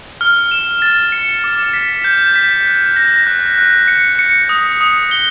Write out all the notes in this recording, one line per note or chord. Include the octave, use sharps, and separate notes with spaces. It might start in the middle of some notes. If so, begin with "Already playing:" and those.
F6
E7
A6
C#7
D6
B6
G6
B6
F#6
A#6
F#6
F#6
C#7
C#7
D#6
D#6
G7